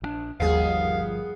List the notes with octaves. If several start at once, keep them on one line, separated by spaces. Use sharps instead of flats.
A#1 E3 D4
G1 D#2 F3 G3 B3 G#4 F5